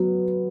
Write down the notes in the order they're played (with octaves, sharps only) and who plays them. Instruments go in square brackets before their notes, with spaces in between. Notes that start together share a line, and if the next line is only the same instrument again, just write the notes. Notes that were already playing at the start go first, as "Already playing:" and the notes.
Already playing: [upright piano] F#3 B3